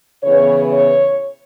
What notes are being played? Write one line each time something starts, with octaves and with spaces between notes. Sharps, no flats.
C#3 E3 B3 C#5
C#5